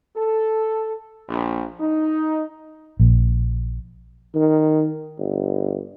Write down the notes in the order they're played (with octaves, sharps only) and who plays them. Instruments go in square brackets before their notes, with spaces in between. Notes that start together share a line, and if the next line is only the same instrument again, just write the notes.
[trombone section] A4
A#1
D#4
[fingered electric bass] A#1
[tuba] D#3
G1